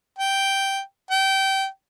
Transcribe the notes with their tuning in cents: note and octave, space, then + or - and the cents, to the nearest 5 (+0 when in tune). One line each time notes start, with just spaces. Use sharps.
G5 -5
G5 -20